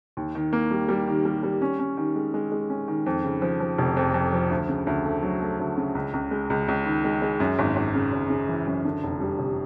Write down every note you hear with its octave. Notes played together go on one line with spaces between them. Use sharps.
D#2
D#3
A#3
G3
G3
D#3
G3
G3
C#4
C#4
D#3
G#3
G#3
G#3
C#4
D#3
F2
C#3
F3
F3
F1
F2
F2
F3
D2
C#3
D2
A3
F#3
A3
D2
C#3
C#2
C#2
G#3
C#2
C#2
D#3
G#3
G#3
F#2
G#1
G#1
C#3
G#1
C#3
E3
F#2
D3
F1
G3
F1